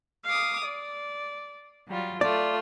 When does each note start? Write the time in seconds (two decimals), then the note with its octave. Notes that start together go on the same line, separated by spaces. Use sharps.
0.25 F5 D6 D#6
0.64 D5
1.87 F#3 G3 F4
2.21 A3 F4 D5